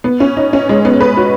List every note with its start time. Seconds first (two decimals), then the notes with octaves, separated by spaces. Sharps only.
0.04 B3
0.20 C#4
0.37 D#4
0.53 C#4
0.69 G#3
0.85 B3
1.00 B4
1.17 F#4